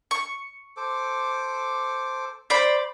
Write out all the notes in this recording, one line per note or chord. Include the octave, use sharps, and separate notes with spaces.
C#6
A4 C5 D6
C5 D5 B5